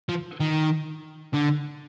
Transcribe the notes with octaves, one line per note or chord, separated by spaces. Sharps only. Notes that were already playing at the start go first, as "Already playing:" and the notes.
F3
D#3
D3